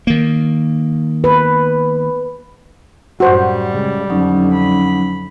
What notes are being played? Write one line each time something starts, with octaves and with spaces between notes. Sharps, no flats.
D#3 A#3
B4
F#2 A2 G3 F#4 C5
C#3 G#3
F2 D3 F#3 C#4 D#4
B5